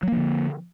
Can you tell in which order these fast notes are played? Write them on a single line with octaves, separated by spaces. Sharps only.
F#3 A#3 F3 D3